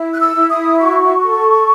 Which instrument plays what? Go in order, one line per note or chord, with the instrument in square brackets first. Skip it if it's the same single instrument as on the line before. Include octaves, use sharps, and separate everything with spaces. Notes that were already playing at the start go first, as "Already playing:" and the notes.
Already playing: [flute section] E4
F#6
E6
E4
D#6
F#4 C#6
A4